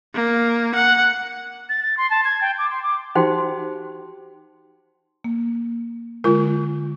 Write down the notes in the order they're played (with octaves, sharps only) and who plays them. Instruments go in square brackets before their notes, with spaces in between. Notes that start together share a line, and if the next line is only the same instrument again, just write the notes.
[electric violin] A#3
F#5
[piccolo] A6
A6
C6
A5
G#6
G5
D6
C6
D6
[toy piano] D#4 F#4 G4 C5 G5 C6
[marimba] A#3
[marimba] D3 G#3 [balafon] F4 A#4